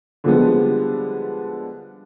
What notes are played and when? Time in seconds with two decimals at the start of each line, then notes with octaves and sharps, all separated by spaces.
0.24 D3 F3 G3 G#3 B3